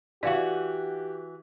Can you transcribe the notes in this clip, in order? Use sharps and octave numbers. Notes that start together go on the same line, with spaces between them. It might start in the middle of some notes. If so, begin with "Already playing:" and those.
E3 F#4 G4 D5 F5